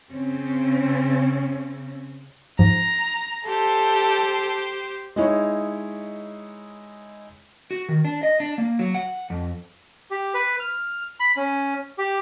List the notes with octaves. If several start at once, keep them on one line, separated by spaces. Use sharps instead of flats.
C#3 C4 C#4
G#2 F3 A#5
G4 A4 C5
G#3 D#4 E4 C#5
F#4
D#3
D4
D#5
D4
A#3
F#3
F#5
F2
G4
B4
F6
B5
C#4
G4